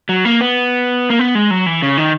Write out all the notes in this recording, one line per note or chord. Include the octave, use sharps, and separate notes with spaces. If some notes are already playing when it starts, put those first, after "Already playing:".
F#3
A#3
B3
A#3
B3
G#3
F#3
E3
C#3
D#3